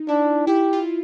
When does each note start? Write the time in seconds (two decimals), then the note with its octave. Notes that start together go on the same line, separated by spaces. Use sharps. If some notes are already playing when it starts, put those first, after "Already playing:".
Already playing: D#4
0.09 D4 E4
0.47 E4 G4
0.73 F4